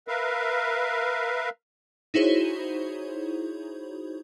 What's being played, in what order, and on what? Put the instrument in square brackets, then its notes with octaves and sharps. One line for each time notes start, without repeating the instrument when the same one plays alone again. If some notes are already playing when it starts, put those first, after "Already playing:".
[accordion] A#4 B4 E5 F5
[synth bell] D#4 E4 F#4 G#4 C5 C#5